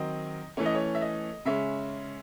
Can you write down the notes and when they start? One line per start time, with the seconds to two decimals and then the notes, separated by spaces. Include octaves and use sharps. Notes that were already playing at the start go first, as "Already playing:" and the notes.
Already playing: D#3 F#3 C4 D#5
0.57 E3 A3 C#4 C#5
0.65 D#5
0.75 C#5
0.95 E5
1.01 D#5
1.45 C#3 G#3 C#4 E5